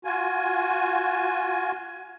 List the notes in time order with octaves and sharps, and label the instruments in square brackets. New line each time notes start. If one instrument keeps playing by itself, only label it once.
[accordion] F4 F#4 G#5